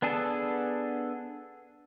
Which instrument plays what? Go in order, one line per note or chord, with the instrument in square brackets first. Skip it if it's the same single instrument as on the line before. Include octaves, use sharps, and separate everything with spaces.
[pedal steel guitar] B3 D4 G#4 A4